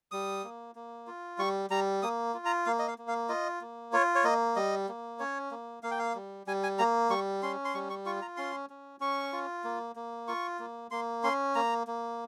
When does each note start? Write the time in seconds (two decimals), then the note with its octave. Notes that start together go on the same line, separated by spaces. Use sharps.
0.11 G3 D#6
0.44 A#3
0.75 A#3
1.07 F4
1.38 G3 C#6
1.70 G3 A#5
2.02 A#3 D#6
2.34 F4
2.45 A#5
2.66 A#3 F5
2.79 D#5
2.88 F5
2.98 A#3
3.08 F5
3.29 F4 D#5
3.61 A#3
3.93 F4 C#5
4.15 C#5
4.24 A#3 D#5
4.56 G3 D#5
4.89 A#3
5.19 C#4 C#5
5.51 A#3
5.83 A#3 F5
5.91 G5
5.99 F5
6.15 G3
6.47 G3 G#5
6.63 G#5
6.79 A#3 A#5
7.10 G3 C#6
7.43 C#4 C6
7.65 C6
7.74 G3 C#6
7.90 C#6
8.06 F4 C#6
8.22 A#5
8.37 C#4 C6
8.70 C#4
9.00 C#4 C#6
9.33 F4
9.64 A#3
9.96 A#3
10.28 F4 C#6
10.59 A#3
10.91 A#3 C6
11.24 C#4 C6
11.55 A#3 A#5
11.87 A#3